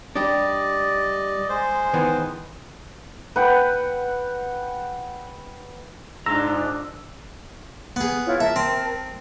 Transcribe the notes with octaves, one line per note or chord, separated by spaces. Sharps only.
G3 D4 D5 D#5
G#3 C5
D#3 E3 B3
B4 F#5 G5
G#2 D4 F4 A#5 E6
B3 G#4
E4 F4 C#5
A#4 E5 A5
C4